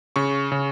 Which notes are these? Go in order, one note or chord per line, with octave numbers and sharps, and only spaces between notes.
C#3 C#6
C#3